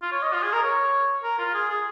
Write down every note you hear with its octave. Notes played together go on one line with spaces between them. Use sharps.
F4
C#5
D#5
F4
G#4
A#4
C#5
A#4
F4
G#4
G#4